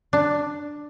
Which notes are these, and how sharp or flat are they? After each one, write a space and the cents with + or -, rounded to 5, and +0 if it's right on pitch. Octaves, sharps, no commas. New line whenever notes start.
D4 +5